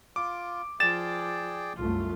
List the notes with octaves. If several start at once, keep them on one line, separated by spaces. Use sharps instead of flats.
F4 D6
F3 G#4 D5 G5 A6 E7
C2 F#2 A3 F4